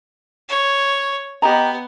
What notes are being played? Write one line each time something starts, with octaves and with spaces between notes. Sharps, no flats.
C#5
B3 G4 D#5 A#5